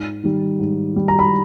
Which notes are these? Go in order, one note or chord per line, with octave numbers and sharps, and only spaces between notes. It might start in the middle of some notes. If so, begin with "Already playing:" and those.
Already playing: G#2
D#3 G3
G#2
D#3 G3
A#5
B5